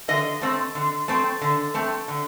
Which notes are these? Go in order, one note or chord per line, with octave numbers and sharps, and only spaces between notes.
D3 D#5
A3 C4
D3
A3 C4
D3
A3 C4
D3